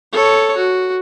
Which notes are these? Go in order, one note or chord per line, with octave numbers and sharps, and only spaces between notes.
A4 C#5
F#4